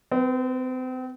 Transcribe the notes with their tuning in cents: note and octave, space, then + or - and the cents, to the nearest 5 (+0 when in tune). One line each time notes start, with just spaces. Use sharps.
C4 -35 B4 +0